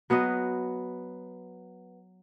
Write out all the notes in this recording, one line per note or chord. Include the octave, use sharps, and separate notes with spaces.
F#3 B3 B4 D#5